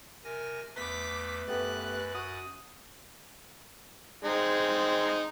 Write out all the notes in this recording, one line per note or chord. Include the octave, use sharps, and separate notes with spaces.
C3 A#4 G#5 A#6
E2 A3 B4 D6 B6
F#2 A3 B3 G4 F#6 A6
F#4 D#6
G#3 C4 D#4